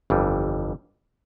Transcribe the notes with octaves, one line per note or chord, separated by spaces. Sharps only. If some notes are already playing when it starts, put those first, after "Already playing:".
G1 F2 E3 G3